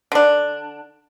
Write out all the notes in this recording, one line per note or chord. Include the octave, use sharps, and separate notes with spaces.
D3 D4